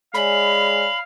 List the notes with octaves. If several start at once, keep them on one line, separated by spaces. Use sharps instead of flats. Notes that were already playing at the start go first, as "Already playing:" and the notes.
G#3 C#5 D5 F5 G#5 B5